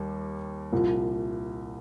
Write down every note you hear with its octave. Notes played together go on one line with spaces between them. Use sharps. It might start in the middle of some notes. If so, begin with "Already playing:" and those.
Already playing: D#2 G3
C2 A#2 F3